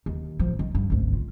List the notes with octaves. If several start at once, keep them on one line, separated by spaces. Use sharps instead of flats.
D#2
A1 F3
D#3
G2
G#1 D2
F4